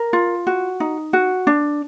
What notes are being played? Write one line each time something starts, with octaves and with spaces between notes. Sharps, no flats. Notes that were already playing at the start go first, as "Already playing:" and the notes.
Already playing: A#4
F4
F#4
D#4
F#4
D4